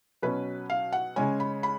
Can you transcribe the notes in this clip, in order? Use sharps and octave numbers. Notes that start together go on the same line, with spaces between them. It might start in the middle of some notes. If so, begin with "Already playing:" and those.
B2 F#3 C#4 B4
F5
F#5
C#3 G#3 C#4 G#5
B5
B5